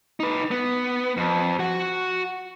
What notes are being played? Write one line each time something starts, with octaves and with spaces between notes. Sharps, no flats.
D#4 B4
B3
F2
F#4 F#5